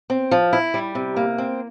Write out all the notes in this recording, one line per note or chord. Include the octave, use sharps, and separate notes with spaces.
C4
F3
E4
G3
C3
A#3
C4